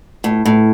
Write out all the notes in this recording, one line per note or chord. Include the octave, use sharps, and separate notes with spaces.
A2
A2